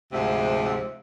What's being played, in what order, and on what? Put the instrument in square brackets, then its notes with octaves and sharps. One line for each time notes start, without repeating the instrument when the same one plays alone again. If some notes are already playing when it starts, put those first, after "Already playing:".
[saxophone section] D2 G#2 C3 F3 E5